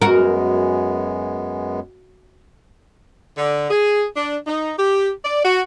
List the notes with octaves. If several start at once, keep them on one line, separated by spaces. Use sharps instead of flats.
F#2 G#3 B3 F#4 A#4
D3
G#4
D4
D#4
G4
D5
F#4